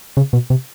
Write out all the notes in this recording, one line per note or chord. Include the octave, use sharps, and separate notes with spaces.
C#3
B2
C3